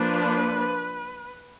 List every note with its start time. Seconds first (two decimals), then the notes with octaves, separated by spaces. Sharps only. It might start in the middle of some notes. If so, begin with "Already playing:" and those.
Already playing: F3 A#3 D4 B4